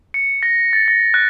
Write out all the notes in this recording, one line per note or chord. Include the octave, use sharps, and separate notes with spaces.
C#7
A#6
A6
A#6
F#6